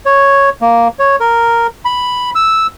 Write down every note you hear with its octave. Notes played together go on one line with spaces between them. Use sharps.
C#5
A#3
C#5
A#4
B5
E6